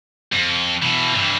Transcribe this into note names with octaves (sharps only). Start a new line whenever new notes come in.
F2
B2 E3
G2 E3